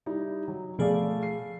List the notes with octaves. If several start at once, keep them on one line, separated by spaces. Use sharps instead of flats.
G3 D#4 E4
F#3
B2 F3 A3 G#4 D5 F5
C7